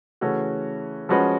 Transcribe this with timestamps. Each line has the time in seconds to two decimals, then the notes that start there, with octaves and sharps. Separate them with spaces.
0.21 C#3 E3 A3 C#4 F#4
1.09 F3 G#3 C#4 F#4 B4